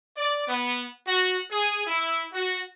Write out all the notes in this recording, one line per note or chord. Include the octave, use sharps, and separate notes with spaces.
D5
B3
F#4
G#4
E4
F#4